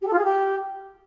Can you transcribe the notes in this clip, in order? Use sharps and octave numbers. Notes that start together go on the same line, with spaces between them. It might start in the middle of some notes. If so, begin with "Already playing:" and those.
G4
A4
F4
G#4
G4